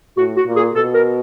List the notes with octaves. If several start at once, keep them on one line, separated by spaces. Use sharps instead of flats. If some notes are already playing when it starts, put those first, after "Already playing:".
A2 F#4
F#4
A#2
G#4
B2 A4
A#4